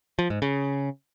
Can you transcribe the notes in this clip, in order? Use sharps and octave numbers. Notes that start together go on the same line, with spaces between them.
F3
G#2
C#3